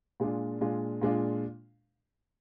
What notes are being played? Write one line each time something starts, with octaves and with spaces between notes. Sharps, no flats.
A#2 G#3 D4 F4
A#2 G#3 D4 F4
A#2 G#3 D4 F4